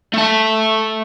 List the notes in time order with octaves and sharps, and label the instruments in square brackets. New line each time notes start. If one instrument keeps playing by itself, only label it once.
[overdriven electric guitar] A3 A5